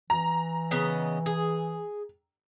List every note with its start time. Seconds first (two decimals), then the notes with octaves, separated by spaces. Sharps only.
0.10 E3 A#5
0.71 C#3 B3 D#5
1.26 G#4